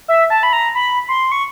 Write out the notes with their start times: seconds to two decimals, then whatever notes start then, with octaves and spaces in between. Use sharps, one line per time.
0.08 E5
0.30 A5
0.43 B5
0.53 A#5
0.75 B5
1.08 C6
1.32 C#6